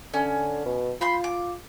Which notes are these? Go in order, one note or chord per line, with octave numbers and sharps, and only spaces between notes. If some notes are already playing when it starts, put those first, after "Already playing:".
D3 C#4
B2
F4 B5 C6 G6
D6